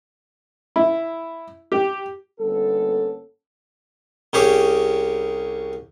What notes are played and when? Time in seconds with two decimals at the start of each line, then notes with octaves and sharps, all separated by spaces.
0.76 E4
1.72 G4
2.40 G1 A#3 B3 C#4 A4
4.33 C2 C#4 G4 G#4 D6